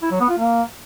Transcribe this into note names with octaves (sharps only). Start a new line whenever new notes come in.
E4
F#3
B3
F4
A#3